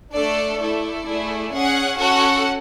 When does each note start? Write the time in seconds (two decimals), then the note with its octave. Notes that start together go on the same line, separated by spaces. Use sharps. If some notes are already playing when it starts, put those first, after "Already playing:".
0.13 A3 D4 A4 D5
0.59 A3 E4 A4 D5
1.05 A3 E4 G#4
1.51 C#4 G#4 F#5
1.97 C#4 F#4 A4 F#5